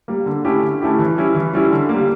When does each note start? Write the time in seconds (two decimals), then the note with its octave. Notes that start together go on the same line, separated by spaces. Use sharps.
0.08 G3 A#3
0.26 D3
0.45 A3 C#4 E4 G4
0.63 D3
0.81 A3 C#4 E4 G4
0.99 E3
1.17 G3 C#4 E4
1.35 E3
1.53 G3 C#4 E4
1.70 D3
1.89 G3 A#3